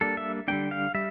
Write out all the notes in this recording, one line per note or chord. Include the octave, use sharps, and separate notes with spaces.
G3 A#3 D4 A4
E5
D3 G3 A#3 D4 G5
F5
G3 E5